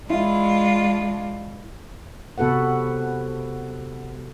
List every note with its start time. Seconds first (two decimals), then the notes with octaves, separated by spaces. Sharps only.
0.10 G#3 D4 E4 F4
2.38 C3 B3 F#4 A4 B4 F#5